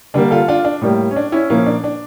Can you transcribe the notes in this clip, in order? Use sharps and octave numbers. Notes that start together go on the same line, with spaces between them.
D3 G3 A#3 D4
F4 A4
D4 F4
D4
A2 G3 A#3
C#4
D4
C#4 E4
A#2 F3 A#3 C#4 E4
D4
D4